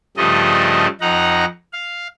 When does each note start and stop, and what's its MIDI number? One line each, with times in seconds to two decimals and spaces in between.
0.17 0.87 43
0.17 0.87 49
0.17 0.87 53
0.17 0.87 55
0.17 0.87 57
0.17 0.87 75
1.01 1.45 41
1.01 1.45 63
1.01 1.45 78
1.01 1.45 82
1.73 2.08 77